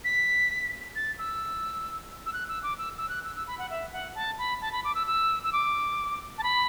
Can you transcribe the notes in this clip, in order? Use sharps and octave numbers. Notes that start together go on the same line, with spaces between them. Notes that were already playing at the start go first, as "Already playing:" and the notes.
B6
A6
E6
E6
F#6
E6
D6
E6
E6
F#6
E6
E6
B5
F#5
E5
F#5
A5
B5
A5
B5
D6
E6
E6
E6
D6
A5
B5